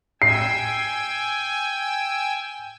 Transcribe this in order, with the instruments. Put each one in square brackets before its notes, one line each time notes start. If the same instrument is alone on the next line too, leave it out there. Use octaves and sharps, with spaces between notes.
[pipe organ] G5 G#5 E6 [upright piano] C7